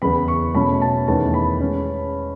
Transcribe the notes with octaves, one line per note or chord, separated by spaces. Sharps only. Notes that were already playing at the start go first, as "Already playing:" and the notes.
E2 C#3 E3 B5
C#6
B2 A3 C#4 B5
A5
E2 D#3 A3 C#4 A5
B5
G#3 C#4